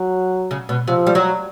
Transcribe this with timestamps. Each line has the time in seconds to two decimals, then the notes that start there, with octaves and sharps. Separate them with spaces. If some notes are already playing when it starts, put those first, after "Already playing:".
Already playing: F#3
0.51 C#3
0.69 B2
0.88 C3 F3
1.07 G3
1.15 F#3